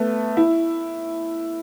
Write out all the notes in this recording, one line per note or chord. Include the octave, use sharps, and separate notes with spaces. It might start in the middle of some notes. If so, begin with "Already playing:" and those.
Already playing: A3 B3
E4